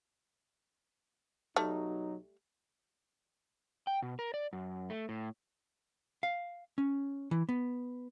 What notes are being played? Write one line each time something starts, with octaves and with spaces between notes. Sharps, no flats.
B1 F#3 G3 A3 D#4
G5
B2
A#4
D5
F#2
A3
A2
F5
C#4
E3
B3